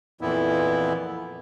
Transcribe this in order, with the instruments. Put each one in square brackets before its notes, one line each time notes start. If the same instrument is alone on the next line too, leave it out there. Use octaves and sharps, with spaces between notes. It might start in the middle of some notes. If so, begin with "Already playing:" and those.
[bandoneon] F2 A#2 E3 B3 E4